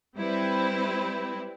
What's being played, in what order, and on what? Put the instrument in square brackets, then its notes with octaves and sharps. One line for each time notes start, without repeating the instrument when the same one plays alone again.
[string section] G3 C4 E4 B4